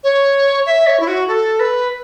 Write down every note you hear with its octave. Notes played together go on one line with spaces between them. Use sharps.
C#5
E5
C#5
E4
F#4
A4
B4